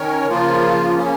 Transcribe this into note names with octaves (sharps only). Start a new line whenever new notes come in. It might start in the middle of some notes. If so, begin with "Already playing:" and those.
Already playing: D#3 C#4 A#4 C#5
C#3 F3 A#3 F4
C#3 A#3 C#4